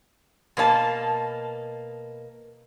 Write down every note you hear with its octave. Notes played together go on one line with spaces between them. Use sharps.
B2 A#3 C#5 A5